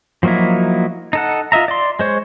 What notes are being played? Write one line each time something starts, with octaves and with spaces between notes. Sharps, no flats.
F3 F#3 A#3 D#4 E4
D#4 A4 F#5
F4 D#5 E5 A#5
D5 C6
G#3 C5 C#5